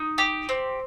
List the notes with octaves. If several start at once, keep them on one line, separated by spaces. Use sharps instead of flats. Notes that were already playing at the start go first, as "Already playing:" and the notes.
Already playing: D#4
G4
C4